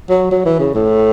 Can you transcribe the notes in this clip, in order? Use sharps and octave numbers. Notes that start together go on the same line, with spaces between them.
F#3
F#3
E3
C#3
A2